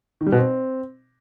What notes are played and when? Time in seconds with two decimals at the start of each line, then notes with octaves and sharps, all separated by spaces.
0.21 D#3
0.26 G3
0.32 B2
0.38 C4